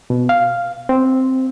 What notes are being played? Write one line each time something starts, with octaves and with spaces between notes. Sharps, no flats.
B2
F5
C4